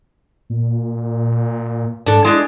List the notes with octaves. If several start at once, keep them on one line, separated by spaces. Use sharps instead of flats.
A#2
G#2 D4 A4
G#3 D4 E4